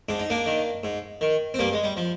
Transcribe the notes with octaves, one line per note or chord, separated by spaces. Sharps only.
G#2 D4
D#4
A#3 D4
D#3
G#2
D#3
C4
G2 G3 A#3
G#3
G3
F3